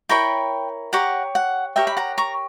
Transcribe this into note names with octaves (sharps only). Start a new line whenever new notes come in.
E4 A#4 C#5 G5 B5
G4 C#5 F#5 A#5
F#5
G4 A#4 C#5 E5 G5
B5
F#5 A#5
A#5 C#6